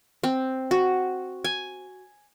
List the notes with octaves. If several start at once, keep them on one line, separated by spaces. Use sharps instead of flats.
C4
F#4
G#5